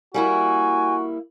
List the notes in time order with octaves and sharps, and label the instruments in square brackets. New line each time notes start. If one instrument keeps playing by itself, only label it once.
[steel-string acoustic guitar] G3 A#3 E4 [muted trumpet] F#4 [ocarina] G#5